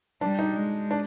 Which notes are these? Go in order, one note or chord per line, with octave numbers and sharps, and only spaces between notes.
G3 D4
D#4
G#3
D4